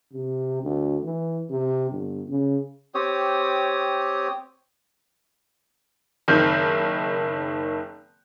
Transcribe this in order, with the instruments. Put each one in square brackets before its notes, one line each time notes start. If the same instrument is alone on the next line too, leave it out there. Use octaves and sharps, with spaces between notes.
[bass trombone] C3
D2
E3
C3
G1
C#3
[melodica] C4 G4 C#5 D#6
[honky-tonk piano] F#1 D#3 C4 F6 G6